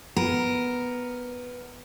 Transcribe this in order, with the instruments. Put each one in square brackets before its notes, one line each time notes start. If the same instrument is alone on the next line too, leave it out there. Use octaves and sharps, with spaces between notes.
[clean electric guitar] B3 [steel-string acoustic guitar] A#4